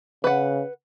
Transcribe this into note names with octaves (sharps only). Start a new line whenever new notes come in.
C#3 B4 F#5